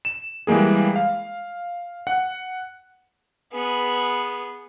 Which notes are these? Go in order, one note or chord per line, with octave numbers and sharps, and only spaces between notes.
E7
E3 G3 G#3 A#3 G#4
F5
F#5
B3 G#4